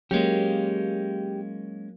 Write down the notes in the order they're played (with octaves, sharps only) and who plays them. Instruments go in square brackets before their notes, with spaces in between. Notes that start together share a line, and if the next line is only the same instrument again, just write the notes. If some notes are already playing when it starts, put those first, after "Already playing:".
[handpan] F#3 A#3 [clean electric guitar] G#3 C#4 [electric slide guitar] G4